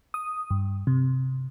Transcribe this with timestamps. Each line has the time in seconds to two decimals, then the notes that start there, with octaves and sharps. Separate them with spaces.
0.14 D#6
0.51 G2
0.87 C3